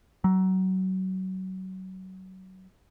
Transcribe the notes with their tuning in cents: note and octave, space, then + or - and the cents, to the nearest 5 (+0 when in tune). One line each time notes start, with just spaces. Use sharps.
F#3 +25